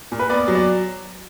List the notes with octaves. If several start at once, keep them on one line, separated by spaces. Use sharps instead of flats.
A#2
B4
B3 D5
F#3
D5